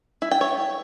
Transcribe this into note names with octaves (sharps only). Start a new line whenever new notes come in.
E4
G5
C#5